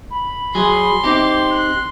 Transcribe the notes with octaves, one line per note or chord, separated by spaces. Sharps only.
B5
F#3 G#4 C6
C4 D#4 G4 D6
F#6